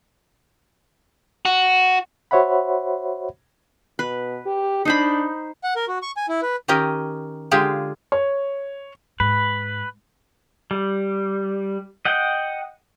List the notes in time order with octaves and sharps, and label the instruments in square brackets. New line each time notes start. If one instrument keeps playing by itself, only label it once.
[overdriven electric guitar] F#4
[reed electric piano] F#4 C5 C#5 E5 F#5 B5
[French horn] B2 [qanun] B4
[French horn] G4
[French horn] D4 [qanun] D#4 C5 B5
[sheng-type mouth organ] F#5
A#4
F#4
C#6
G#5
E4
B4
[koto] D#3 C#4 G4 A#4 D#5
D3 G#3 F4 G4 G#4
[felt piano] C#5
[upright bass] G#2 [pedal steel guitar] B4
[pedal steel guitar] G3
D#5 F#5 G5